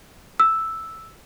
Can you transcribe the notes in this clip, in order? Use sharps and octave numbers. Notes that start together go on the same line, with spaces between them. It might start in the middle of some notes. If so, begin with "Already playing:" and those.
E6